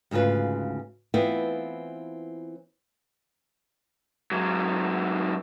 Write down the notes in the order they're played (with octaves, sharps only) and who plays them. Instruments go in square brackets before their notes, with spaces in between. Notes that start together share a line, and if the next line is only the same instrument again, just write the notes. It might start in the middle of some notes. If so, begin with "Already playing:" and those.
[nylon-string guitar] D2 G#2 C#3 F4 B4
E3 B3 C4 E4 F4
[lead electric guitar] G#2 F#3